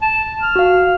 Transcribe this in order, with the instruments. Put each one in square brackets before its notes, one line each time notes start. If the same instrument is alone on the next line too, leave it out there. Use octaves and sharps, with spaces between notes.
[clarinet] A5
F6
[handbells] F#4 F5